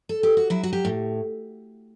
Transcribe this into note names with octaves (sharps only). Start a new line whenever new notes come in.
A4
G4
F#4
F#3 E4
F#4
G4
A2